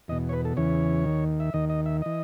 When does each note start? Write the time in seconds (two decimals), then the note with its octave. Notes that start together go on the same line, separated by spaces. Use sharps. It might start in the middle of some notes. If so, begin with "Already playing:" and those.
0.08 E2 B2 D#5
0.29 C#5
0.33 B4
0.45 A4
0.57 E2 C#3 E3 C#5
1.05 D#2 D#3
1.40 E5
1.54 D#2 D#3 D#5
1.70 D#5
1.86 E5
2.02 E3 D#5